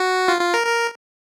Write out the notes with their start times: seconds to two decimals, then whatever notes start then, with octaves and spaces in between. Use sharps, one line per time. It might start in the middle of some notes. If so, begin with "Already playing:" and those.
Already playing: F#4
0.28 F4
0.41 F4
0.54 A#4
0.67 A#4